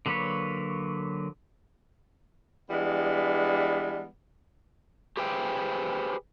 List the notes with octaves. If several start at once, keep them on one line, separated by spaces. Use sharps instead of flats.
D3 F#3 A#3 B4 C#5
E3 G3 G#3 B3 D4
G4 G#4 B4 C5 E5 G5